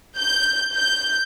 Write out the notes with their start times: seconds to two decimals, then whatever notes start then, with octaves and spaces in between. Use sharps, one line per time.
0.18 G6
0.72 G6